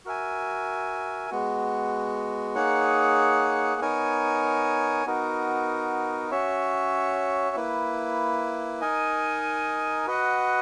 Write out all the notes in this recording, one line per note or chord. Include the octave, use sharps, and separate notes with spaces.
F#4 A#4 E5 G#5
G#3 B3 F#4
A#3 D#4 G#4 C#5 F#5
B3 D#4 A#4 C#5 G#5
B3 D#4 F#4 A#4
C#4 F#4 C#5 E5
A#3 E4 B4
D#4 A#4 D#5 G#5
F#4 B4 D#5 F#5